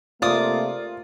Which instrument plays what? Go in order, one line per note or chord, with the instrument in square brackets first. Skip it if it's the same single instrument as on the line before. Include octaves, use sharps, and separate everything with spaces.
[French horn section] C3 A3 A#3 [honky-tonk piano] F4 [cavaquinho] D5 D#6